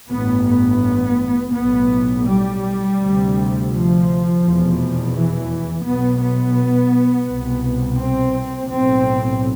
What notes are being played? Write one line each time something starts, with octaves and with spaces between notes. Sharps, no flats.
A1 G2 B3
B3
B1 A2 B3
G3
D2 C3
F3
F1 E2 B2
E3
B1 B2 B3
B3
C2 B2
C4
B1 A2 C4